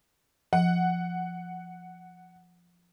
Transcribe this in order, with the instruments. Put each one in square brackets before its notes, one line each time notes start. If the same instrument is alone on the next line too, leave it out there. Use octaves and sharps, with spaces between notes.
[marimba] F3 [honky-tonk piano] F#5